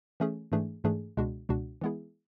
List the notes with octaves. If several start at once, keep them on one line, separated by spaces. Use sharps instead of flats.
E3 A3 C#4 G#4
G#2 E3 A3 D4 G#4
G#2 E3 A3 D4 G#4
C#2 B2 G#3 D4 F#4
C#2 B2 G#3 D4 F#4
E3 G#3 B3 E4 G#4